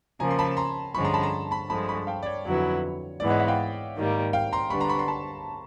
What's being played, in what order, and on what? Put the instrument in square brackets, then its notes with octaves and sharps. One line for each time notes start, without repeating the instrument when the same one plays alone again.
[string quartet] C#3 F3 A#3 [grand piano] G#5 A#5
[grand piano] C6
A5 B5
A#5 C6
[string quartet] G2 D3 F3 G#3 C#4 [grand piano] B5 C#6
[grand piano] A#5 C6
A5 B5
A#5 C6
A5 B5
[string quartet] G2 D3 F3 G#3 [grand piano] A5 B5
[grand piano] B5 C#6
F5 G5
D5
C#5
[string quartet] F2 D3 F#3 B3 E4 [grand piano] C#5
[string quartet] G#2 E3 G#3 B3 [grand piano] D5
[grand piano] C#5 D#5
E5 F#5
F5 G5
[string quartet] G#2 D#3 G3 A#3
[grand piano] F5 G5
A#5 C6
[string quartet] D3 G3 B3 D4 [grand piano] B5 C#6
[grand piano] A#5 C6
B5 C#6
A#5 C6
A5 B5